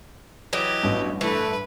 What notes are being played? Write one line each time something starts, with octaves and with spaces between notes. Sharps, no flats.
E3 F#3 D#4 G4
A1 G2 B2
E3 A3 B4